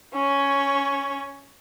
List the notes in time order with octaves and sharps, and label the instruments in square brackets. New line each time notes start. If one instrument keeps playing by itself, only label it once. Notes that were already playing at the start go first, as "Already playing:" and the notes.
[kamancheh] C#4 C#5